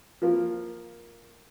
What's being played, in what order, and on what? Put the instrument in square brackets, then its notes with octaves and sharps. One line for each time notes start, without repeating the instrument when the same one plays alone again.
[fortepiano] F3 A#3